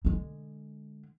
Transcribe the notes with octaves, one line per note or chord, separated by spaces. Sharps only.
D3 G#3